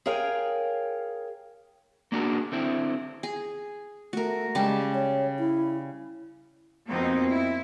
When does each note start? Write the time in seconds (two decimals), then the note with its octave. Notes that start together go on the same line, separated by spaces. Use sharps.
0.06 G#4 A#4 C#5 F5 G5 G#5
2.12 A#3 D4 F#4 G#4 A#4
2.52 D3 C4 E4
3.23 G#4
4.13 A3 F#4 A#4
4.55 C#3 G3 G#3 A5
4.94 C#5
5.39 E4
6.89 F2 B2 A#3 C4 D#4
7.29 E4